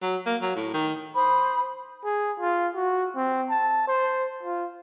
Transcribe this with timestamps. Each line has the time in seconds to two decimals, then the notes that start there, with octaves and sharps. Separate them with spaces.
0.02 F#3
0.26 A#3
0.42 F#3
0.56 A2
0.74 D#3
1.14 C5 B5 D#6
2.04 G#4
2.40 F4
2.75 F#4
3.16 C4
3.50 A5
3.88 C5
4.43 F4